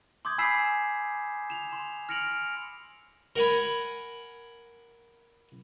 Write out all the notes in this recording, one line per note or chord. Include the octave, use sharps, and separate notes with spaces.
C6 D6 D#6 G6 G#6
G#5 B5 E6 B6 C7 E7
E7 F7
C6
F6 A#6 C#7 D7 F7 F#7
A#4 F#5 G#5 B5